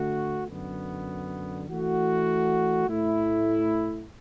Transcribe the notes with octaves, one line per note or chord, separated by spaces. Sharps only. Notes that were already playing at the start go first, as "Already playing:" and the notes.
Already playing: D3 A3 F#4
F#2 D3 B3
E3 A3 F#4
A2 A3 E4